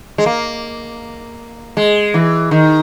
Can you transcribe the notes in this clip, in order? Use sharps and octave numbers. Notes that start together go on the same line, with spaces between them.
G#3
A#3
G#3
E3
D#3